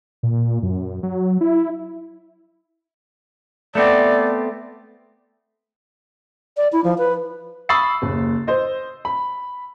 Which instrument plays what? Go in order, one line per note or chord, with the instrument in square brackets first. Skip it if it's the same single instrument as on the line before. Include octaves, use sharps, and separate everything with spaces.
[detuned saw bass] A#2
F#2
F#3
E4
[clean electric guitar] A3 B3 C4 [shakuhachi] D5
[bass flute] D5
E4
F3
B4
[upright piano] B5 C#6 D#6 E6 A6 C7
F#1 D#2
C5 D#5
B5